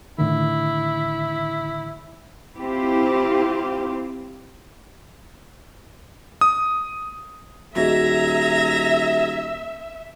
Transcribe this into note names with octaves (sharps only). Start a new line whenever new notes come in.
A2 D3 D#3 E4
C4 E4 F4 G4
D#6
D#1 F#4 G#4 D#5 E5 A#5 G#6 A#6